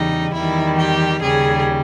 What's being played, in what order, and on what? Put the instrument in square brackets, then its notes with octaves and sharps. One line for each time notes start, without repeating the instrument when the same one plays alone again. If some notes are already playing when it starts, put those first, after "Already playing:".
Already playing: [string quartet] E2 C#3 G3 D#4
E2 D#3 G3 E4
G4
D#2 C#3 G3 G#4